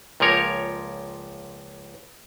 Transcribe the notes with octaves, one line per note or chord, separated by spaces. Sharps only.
C#2 A#2 F3 A#4 C#5